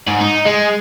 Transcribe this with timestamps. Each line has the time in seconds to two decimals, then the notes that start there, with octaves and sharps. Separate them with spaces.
0.07 G#2
0.20 D#4
0.46 G#3